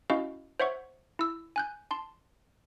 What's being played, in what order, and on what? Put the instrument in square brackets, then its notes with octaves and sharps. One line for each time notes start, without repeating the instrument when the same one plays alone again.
[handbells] C#4 E4 F#4 D#5 F5
C5 C#5 E5 F#5 C#6
E4 E6
G#5 F#6 G6
A5 C6